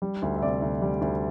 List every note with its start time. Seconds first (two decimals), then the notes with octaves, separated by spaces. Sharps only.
0.02 G3
0.22 D2
0.36 E5
0.42 C3 D5
0.62 D2
0.82 G3
1.01 D2